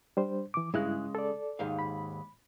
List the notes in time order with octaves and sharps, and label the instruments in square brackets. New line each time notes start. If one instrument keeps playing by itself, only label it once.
[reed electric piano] G3 D4 C5
E3 D6
[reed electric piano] G2 E4 F#6 [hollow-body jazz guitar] C#3 G#3
[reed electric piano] A4 D5
[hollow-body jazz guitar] D#2 G#2 F5
[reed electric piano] B5